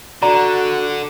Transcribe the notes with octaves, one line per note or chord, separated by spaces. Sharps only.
D3 F#4 D5 A#5